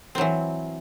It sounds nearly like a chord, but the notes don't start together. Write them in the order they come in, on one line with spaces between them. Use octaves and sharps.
C4 F#3 E3